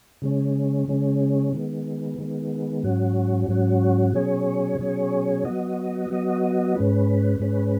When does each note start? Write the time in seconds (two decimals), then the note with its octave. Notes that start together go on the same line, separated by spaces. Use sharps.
0.22 C#3 G#3 C#4
0.88 C#3 G#3 C#4
1.53 D#3 G#3 B3
2.18 D#3 G#3 B3
2.83 G#2 F#3 C#4 F#4
3.48 G#2 F#3 C#4 F#4
4.13 B2 F#3 C#4 G#4 C#5
4.79 B2 F#3 C#4 G#4 C#5
5.45 F#3 B3 F#4 D#5
6.10 F#3 B3 F#4 D#5
6.75 G#2 G#3 C#4 B4
7.39 G#2 G#3 C#4 B4